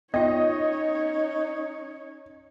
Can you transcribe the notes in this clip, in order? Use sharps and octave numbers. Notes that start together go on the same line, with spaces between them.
B3 C#4 D#4 F4 C#5 D#5